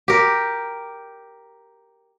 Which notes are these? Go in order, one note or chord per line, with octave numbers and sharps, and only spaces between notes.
G4 A#4